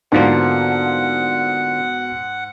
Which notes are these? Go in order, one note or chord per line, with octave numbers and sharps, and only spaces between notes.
G#2 D3 F3 A#3 B3 F#4 F#5